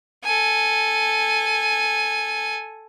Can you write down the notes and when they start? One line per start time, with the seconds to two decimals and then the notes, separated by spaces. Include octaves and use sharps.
0.24 A4 G#5